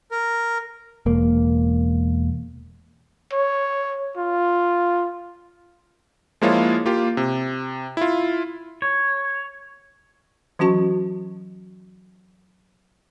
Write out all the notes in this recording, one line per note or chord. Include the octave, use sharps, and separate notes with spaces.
A#4
E1 A#3
C#5
F4
F3 G#3 A#3 E4 F4 C#5
A#3 F4 G4
C3
E4 F4
C#5
E3 F#3 C#4 F#4 A5 C#6